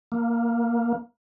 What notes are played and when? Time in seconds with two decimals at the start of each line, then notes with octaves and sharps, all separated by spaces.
0.12 A#3